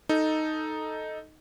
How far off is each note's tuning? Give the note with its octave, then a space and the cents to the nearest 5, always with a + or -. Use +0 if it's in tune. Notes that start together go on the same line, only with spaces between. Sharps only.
D#4 +0 A4 +0